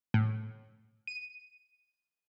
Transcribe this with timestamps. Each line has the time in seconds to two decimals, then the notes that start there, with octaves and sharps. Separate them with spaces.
0.14 A2
1.07 D#7